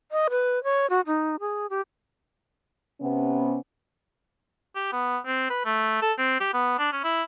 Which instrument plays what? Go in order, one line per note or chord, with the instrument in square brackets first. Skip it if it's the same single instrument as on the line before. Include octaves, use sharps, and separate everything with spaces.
[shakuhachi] D#5
B4
C#5
F#4
D#4
G#4
G4
[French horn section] C3 B3 C#4
[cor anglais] G4
B3
C4
B4
A3
A4
C4
G4
B3
D4
C#4
E4